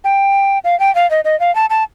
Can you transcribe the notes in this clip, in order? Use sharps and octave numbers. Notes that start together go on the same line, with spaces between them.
G5
F5
G5
F5
D#5
D#5
F5
A5
A5